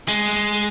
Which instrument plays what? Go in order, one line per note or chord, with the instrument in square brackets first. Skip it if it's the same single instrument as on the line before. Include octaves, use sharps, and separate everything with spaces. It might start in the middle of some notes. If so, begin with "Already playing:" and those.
[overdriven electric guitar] G#3